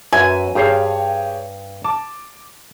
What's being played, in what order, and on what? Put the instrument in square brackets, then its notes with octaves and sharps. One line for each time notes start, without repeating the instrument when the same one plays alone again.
[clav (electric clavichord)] F#2 [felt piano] F#4 B4 E5 [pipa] G#5
[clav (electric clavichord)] G2 C5 F5 [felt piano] G4 G#4 C#5
[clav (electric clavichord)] A5 [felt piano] D6